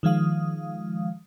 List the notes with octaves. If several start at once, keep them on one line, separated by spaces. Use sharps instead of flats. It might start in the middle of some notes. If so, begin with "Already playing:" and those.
D#3 F3 G#3 F5 D#6